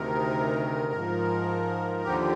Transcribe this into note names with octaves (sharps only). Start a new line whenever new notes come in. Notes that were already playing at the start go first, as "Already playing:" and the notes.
Already playing: D2 C3 D#3 A#4
G#2 F3
D#2 D3 F3 G4